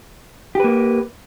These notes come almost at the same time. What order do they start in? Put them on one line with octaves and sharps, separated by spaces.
G4 B4 A#3